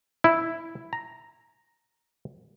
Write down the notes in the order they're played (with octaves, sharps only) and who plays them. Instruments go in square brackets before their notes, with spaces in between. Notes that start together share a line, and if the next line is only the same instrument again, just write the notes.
[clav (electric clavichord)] E4
A#5